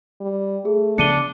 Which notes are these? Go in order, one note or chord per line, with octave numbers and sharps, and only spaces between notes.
G3
A3 G#4
C#3 F3 B3 D4 C#7 D#7 G7